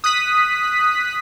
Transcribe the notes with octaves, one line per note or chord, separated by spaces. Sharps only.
D#6 F#6 B6